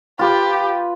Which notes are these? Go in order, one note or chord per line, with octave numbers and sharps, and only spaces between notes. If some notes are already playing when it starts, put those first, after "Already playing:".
F4 G4 B4